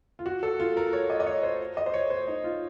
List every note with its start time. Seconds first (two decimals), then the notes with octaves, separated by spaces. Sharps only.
0.19 F4
0.26 F#4
0.43 A4
0.60 F4
0.77 A#4
0.93 C#5
1.10 D#5
1.20 D#5
1.27 C#5
1.43 C5
1.77 D#5
1.86 C5
1.94 C#5
2.10 C5
2.27 D#4
2.44 F4